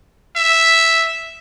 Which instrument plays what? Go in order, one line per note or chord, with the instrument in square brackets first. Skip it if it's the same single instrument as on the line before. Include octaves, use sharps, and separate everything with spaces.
[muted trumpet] E5